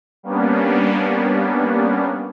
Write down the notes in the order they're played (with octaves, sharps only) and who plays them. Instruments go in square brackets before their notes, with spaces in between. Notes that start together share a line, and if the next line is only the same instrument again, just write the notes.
[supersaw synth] G3 A#3 B3 C#4 D4